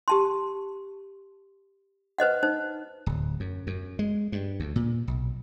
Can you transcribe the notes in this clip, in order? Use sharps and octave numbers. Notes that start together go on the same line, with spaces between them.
G4 A5 C6
B4 C5 D#5 F#5
D#4 C5
D1
F#2
F#2
G#3
G2
D2
A#2
B1